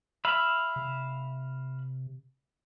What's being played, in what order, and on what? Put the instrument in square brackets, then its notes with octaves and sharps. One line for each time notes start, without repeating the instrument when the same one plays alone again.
[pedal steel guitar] E5 F5 B5
[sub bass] C3